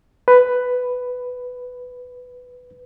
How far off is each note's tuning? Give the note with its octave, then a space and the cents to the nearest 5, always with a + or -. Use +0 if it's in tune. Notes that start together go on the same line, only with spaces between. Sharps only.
B4 +5